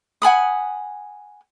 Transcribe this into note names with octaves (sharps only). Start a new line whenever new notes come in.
F#5 G#5 B5 D#6